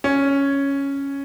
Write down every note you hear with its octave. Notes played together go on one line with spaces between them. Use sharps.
C#4